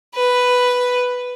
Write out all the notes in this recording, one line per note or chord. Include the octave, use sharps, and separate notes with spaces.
B4